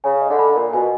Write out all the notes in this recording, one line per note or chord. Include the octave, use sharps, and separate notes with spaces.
C#3 G#5
D#5
D3
B5
A#2 A#4
B2 G#5